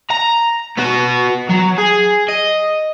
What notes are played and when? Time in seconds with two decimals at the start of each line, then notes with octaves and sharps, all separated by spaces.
0.10 A#5
0.78 B3 F#4
1.49 F#3
1.78 G#4
2.28 D#5